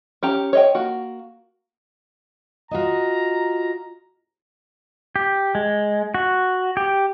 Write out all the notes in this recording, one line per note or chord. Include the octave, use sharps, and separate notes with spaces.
C#4 G4 A#5
C#5 D#5 G5
A#3 F#4
F4 F#4 D#5 A#5
G4
G#3
F#4
G4